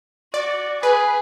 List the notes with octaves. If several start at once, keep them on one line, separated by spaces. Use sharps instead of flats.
F#4 D5
G#4 B4